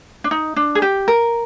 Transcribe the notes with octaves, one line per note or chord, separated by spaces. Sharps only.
D4
D#4
D4
G#4
G4
A#4